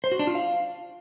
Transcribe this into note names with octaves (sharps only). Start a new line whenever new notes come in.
C5
F#4
D4
F4
F5